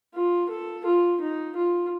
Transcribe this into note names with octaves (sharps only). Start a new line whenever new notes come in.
F4
A4
F4
D#4
F4